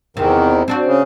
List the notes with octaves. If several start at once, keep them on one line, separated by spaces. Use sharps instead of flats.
E2 C3 D#3
C4 D4 F#4
C#3